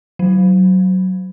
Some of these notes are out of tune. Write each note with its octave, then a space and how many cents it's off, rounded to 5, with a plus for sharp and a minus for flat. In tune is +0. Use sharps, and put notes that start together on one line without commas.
F#3 +10